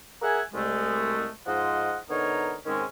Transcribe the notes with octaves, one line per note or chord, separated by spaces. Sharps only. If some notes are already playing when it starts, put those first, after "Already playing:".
G#4 A#4 E5 F#5 G#5
C2 G#3 A3
G#2 F3 F4 C5 D#5 F#5
D3 B3 D#4 A#4 C#5
G#2 D#3 G#3 C4 C#4